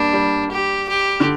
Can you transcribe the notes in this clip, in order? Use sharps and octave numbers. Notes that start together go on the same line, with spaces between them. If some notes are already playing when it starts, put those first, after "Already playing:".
Already playing: G3 A#3 D4
G3
G4
G4
D3